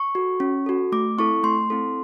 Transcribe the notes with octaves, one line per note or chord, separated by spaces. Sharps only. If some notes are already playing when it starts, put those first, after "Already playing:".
Already playing: C#6
F#4 A4
C#4
F#4 A4
A3 D6
C4 E4 A4 C#6
A3 C6
C4 E4 A4